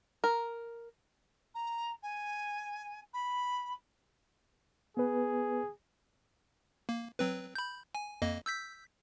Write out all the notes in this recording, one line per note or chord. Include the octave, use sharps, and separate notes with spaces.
A#4
A#5
G#5
B5
B3 G#4 B4
A#3
F#3 C4 B4
B5 G6
G#5
F2 A#3 D#5
E6 G6 B6